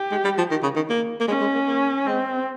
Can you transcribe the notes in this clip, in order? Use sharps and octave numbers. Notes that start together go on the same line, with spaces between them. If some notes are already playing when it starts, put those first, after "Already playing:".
Already playing: G4
G#3
G3
F3
D#3
C#3
D#3
A#3
A#3
G#3 C#4
G#3
A#3
A#3
G#3 C4